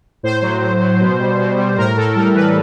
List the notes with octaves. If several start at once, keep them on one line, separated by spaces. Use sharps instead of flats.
A2 C5
F#3
A2
F#3
B2
G3
B2
G3
A2 A#4
A2 A4
G3 A#4
E3 B4